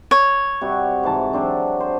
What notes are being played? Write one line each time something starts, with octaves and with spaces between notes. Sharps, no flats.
C#5
C3 G3 F#4
G#2 E3 A5
F#3 C4 D4
C5